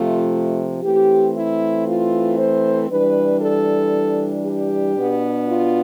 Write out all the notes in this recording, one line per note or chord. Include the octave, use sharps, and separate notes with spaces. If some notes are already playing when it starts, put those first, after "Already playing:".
Already playing: C3 F3 A3 F4
E3 A3 C4 G4
E4
F4
C5
E3 G3 D4 B4
A4
G4
B2 B3 D4
F4